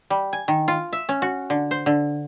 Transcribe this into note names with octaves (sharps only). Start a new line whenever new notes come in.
G3
G#5
D#3
F4
E5
C#4
F#4
D3
C5
D3